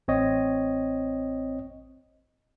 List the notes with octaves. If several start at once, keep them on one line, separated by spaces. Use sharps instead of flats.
A1 C4 C#5 D#5